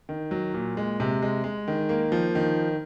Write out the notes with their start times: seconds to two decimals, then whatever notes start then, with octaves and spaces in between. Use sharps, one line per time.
0.09 D#3
0.31 F#3
0.54 A#2
0.77 G#3
1.00 C3
1.22 G#3
1.44 G#3
1.68 D#3
1.89 A#3
2.12 F3
2.35 D#3